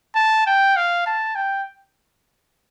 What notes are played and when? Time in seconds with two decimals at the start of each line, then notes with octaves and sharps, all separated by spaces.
0.15 A5
0.46 G5
0.76 F5
1.06 A5
1.35 G5